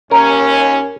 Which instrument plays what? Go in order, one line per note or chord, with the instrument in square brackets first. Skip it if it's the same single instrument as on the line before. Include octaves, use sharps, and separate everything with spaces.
[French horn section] D#2 C#4 [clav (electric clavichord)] A#4